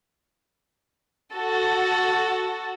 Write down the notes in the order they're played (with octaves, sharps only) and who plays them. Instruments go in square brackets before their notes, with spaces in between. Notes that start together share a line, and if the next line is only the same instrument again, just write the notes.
[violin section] F#4 A4